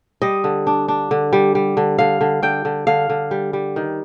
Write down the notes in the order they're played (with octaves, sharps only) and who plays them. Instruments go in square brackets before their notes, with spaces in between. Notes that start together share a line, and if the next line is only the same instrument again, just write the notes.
[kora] G3 D#5
D3
D4
D4
D3
G3
G3
D3
D3 F5
D3
D3 G5
D3
D3 F5
D3
G3
G3
D#3